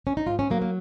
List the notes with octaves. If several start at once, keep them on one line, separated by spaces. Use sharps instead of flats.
C#4
D#4
G#2 F4
C#4
F#3 A#3
A#3